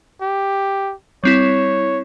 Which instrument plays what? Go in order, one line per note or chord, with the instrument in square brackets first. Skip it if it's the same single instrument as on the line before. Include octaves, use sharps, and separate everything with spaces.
[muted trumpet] G4
[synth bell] G3 C4 E4 [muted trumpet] C#5